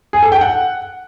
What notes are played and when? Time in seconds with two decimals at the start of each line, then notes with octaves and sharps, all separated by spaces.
0.13 G#4
0.22 A4
0.32 G5
0.41 F#5